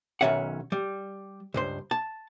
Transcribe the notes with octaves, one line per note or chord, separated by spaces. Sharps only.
B1 C3 D#3 C#4 E5 F#5
G3
C#2 G2 C5
A5